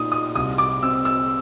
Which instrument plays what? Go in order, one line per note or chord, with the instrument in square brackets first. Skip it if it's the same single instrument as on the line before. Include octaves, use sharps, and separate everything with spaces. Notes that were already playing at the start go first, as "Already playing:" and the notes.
Already playing: [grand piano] A#2 D#4 [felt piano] D#6
[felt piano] D#6
[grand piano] C2 [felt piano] D#6
[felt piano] D6
[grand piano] C4 [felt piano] E6
[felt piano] E6